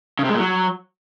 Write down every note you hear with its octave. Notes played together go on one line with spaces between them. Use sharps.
C#3
C3
G#3
A#2
F#3